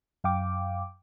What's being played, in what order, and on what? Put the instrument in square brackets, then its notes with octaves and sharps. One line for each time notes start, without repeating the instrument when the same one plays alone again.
[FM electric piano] F#2 F5 G5 D6